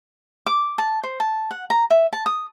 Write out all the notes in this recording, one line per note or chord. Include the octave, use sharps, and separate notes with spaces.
D6
A5
C5
A5
F#5
A#5
E5
A5
D#6